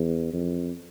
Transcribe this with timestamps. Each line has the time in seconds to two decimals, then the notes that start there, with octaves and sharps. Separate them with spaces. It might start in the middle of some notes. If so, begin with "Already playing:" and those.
Already playing: E2
0.33 F2